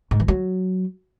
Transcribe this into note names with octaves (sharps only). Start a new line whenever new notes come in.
G#2
E3
F#3